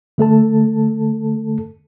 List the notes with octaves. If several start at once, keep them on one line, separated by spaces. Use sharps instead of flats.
D3 A3 A4 A5